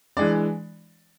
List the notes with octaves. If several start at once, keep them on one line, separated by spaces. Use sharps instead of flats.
E3 G#3 D4 D5